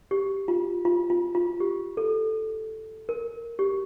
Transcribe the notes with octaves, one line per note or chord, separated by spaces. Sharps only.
G4
F4
F4
F4
F4
G4
A4
A#4
G4